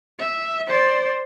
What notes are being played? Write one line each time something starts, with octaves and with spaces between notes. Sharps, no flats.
E5
C5 D5